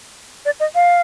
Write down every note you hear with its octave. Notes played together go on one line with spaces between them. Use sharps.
D5
D#5
F5